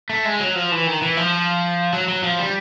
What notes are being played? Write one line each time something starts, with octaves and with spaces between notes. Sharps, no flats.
A3
G#3
F#3
F3
E3
D#3
E3
F3
F#3
F#3
F3
G3